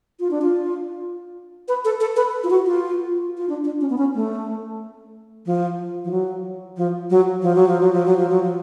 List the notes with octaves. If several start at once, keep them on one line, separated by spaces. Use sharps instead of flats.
F4
D4
F4
B4
A4
A4
B4
F4
F#4
F4
F4
D4
D4
C#4
B3
C#4
A3
F3
F3
F#3
F3
F#3
F3
F#3
F3
F#3
F3
F#3
F3
F#3
F3